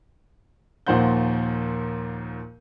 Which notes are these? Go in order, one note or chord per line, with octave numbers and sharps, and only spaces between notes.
D#2 A#2 F3 C5 F#5 G6